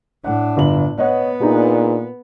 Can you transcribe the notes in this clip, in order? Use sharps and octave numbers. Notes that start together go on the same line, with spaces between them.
A2 D4 F#5
G1 F#7
B3 C#5 D#5 F#5
A#2 D4 D#4 G#4